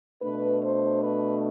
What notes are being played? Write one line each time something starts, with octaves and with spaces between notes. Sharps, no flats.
B2 A3 D4 B4
C5
B4